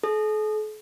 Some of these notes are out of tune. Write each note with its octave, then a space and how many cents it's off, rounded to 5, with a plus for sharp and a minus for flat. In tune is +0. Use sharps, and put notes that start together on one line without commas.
A4 -45